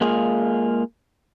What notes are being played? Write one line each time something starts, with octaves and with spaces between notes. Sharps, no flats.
G#3 A#3 F4 G#4